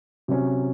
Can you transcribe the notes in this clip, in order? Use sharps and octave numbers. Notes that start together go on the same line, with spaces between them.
C3 F#3 C#4